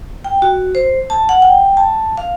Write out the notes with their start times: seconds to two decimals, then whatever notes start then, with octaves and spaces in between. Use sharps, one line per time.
0.24 G5
0.42 F#4
0.75 C5
1.10 A5
1.29 F#5
1.42 G5
1.77 A5
2.17 F5